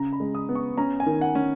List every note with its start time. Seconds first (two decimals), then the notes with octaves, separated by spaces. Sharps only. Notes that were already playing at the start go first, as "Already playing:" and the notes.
Already playing: C#3 A#5
0.13 B5
0.20 G#3
0.35 D#6
0.49 B3
0.55 C#6
0.77 C#4 A#5
1.00 G#5
1.06 D#3
1.21 F#5
1.35 C#4